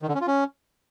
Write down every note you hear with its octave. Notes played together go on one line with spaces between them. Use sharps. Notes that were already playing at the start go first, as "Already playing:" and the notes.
D#3
D3
C#4
F4
C#4